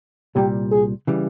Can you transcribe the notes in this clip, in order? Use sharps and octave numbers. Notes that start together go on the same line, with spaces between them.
C2 A#2 G3 G4
G#4
C#3 E3 G3